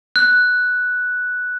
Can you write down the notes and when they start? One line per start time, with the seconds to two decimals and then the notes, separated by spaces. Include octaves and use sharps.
0.16 F#6